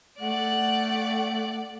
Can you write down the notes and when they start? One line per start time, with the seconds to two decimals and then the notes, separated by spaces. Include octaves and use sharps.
0.20 A3 D5 F#5 F#6